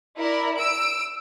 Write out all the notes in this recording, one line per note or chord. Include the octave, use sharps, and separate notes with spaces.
E4 A#4 D5
E6 D7